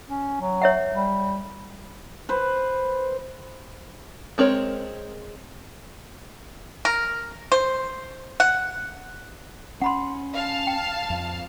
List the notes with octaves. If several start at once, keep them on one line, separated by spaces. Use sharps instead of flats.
C#4
F#3
C#5 E5 F#5
G3
B4 C5
G#3 C4 A#4 C#5
A#4
C5
F#5
C#4 F#5 B5 C6
F5 A5
G5
F2